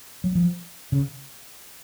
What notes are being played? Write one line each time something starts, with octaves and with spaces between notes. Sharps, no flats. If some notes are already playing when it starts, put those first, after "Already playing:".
F#3
F3
C#3